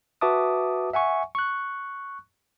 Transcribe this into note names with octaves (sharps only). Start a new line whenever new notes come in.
F#4 B4 E5 A5 D6 D#6
E5 F#5 G#5 C#6
C#6 F#6